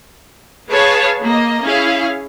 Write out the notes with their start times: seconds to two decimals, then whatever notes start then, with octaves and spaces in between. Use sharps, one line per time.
0.69 G#4 B4 C#5 F5 A5
1.23 A#3 D#5
1.66 C#4 E4 G#4 F5